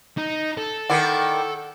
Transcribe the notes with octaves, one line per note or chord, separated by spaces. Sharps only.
D#4
A4
D#3 E4 D5 F#5